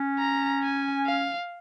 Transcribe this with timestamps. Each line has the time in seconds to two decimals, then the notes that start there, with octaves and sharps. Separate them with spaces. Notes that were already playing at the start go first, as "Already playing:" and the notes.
Already playing: C#4
0.19 A#5
0.62 G#5
1.06 F5